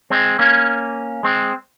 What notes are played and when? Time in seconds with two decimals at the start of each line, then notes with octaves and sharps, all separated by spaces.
0.10 G#3 C4
0.39 A#3 C#4
1.23 G#3 C4